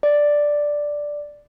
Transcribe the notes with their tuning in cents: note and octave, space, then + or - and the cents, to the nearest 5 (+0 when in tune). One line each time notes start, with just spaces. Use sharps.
D5 +0